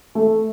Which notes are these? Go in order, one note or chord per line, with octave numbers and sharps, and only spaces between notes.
A3